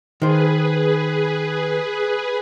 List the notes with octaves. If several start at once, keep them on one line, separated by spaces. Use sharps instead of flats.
D#3 G#4 B4 C5